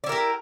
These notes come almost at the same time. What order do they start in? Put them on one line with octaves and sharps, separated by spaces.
D5 E4 A#4 G4